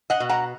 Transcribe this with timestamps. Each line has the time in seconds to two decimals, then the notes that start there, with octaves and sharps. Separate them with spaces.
0.10 D#5 F#5
0.20 B2
0.29 F#5 A#5